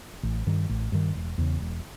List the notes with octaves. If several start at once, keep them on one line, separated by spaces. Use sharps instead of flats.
A1
G2 D#3
A1
G2 D#3
E1
E2 C#3
E1